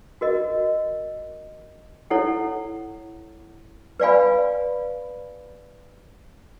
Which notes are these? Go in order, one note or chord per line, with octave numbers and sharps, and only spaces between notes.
F#4 A#4 D#5
E4 A4 C#5 F#5
B4 D5 F5 G#5 B5